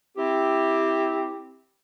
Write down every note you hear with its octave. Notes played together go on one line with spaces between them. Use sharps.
C4 E4 G4